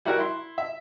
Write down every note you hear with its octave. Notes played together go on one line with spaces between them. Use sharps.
G3 E4 F#4 A#4
E4 C6
E5